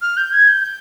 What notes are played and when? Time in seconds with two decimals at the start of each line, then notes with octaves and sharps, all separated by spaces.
0.02 F6
0.17 G6
0.33 G#6
0.48 G6
0.63 G6